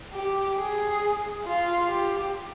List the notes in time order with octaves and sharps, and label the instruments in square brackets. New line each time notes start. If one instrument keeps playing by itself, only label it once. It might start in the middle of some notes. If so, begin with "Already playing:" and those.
[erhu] G4
G#4
F4
G4